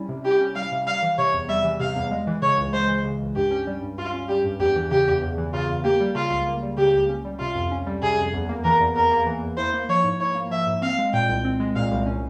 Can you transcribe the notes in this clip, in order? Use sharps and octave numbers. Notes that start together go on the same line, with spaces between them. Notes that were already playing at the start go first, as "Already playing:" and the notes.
Already playing: G3 C#4 E4
C3
E4 G4
C#4
G3 F5
C3
G3 F5
E3
C3 C#5
E2
G3 E5
E3
C3 F5
E2
G#3
E3
C#3 C#5
C#2
G#3 C5
E3
C#3
C#2
G2 G4
C#4
G3
G2
G2 F4
C#4
G3 G4
G2
E2 G4
E3
C#3 G4
E2
E2
E3
C#3 F4
E2
A#3 G4
G3
C#3 F4
C#2
A#3
G3
C#3 G4
C#2
C#4
G3
C3 F4
F2
C#4
G3
C3 G#4
F2
E2
A#3
E3 A#4
E2
E2 A#4
A#3
E3
E2
E4 C5
A#3
F3 C#5
G#2
E4 C#5
A#3
F3 E5
G#2
C4 F5
G#3
A#2 G5
C2
C4
G#3
A#2 F5
C2
C#4